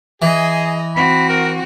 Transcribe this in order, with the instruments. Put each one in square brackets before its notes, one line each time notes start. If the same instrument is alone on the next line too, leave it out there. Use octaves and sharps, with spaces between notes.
[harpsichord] E3 [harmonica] G#4 [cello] D#5
[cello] C4 F#4 [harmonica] B5
[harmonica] A#4